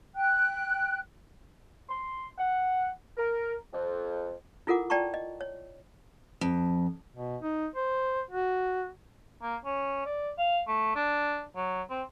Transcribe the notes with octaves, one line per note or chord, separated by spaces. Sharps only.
G5 F#6
C6
F#5
A#4
F2
E4 F4 A4 A#4 F#5 D6
D5 G5 A5 A#5 C#6
D#5
C#5
F2
B2
D#4
C5
F#4
A#3
C#4
D5
F5
A3
D4
F#3
C4